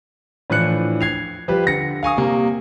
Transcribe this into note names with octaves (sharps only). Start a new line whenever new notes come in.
A2 E3 F3 D4 F#6 C#7
G#6 C7 F7
F3 G3 G4 B4
D3 A#6 C#7
F5 G#5 C#6 D#6
C3 G3 A#3